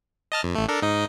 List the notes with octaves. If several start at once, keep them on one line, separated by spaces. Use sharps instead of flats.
D#5 A5 F6
F2
A1 A3
D4 A4 A#4
G#2 D#4 D#5